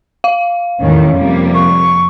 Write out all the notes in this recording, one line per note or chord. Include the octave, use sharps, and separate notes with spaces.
F5
E2 A2 D#3 G3 C#4
F2 C3 G3 A#3
C#6